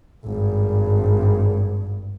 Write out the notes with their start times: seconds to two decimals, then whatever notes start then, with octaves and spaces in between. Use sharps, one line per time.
0.24 G#1 G2